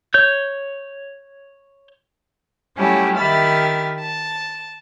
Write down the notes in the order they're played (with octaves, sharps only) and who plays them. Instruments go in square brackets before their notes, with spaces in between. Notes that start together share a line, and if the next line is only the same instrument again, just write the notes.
[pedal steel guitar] C#5 G6
[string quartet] F#3 G3 A3 C#4 E4 G4
D#3 G4 E5 B5 F6 A6
A5